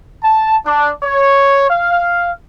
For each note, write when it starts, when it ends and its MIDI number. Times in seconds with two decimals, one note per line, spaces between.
0.23 0.56 81
0.66 0.90 62
1.04 1.66 73
1.70 2.31 77